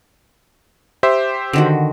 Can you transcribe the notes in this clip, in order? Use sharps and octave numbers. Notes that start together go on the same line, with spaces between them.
G4 C5 E5
D3 D#3 F#4